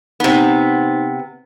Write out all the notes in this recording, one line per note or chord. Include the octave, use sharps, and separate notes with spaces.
C3 B3 D#4 C5